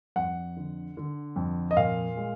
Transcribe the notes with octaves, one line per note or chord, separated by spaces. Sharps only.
F2 F#5
D3
D3
F2
D#5
A#2 F5
G#3